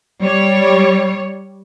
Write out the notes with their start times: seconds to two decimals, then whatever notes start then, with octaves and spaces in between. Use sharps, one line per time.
0.21 G3 C#5